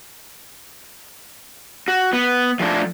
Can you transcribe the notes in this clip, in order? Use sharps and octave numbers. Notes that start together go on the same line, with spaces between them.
F#4
B3
F3 A3 D4